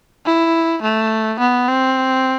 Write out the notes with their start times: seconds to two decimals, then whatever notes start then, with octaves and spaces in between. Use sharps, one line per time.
0.26 E4
0.82 A3
1.39 B3
1.68 C4